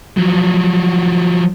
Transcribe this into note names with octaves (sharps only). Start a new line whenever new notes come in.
F3 F#3